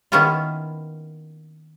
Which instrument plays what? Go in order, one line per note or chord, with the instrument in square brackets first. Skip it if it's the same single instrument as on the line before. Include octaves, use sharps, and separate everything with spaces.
[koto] D#3 A#3 B3 C#4 E4 F4